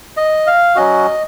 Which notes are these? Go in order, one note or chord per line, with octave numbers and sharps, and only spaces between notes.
D#5
F5
F#3 C#4 F#4 D#5